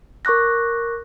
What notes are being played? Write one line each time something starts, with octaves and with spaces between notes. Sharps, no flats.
A#4 C#6 D6 F#6 A#6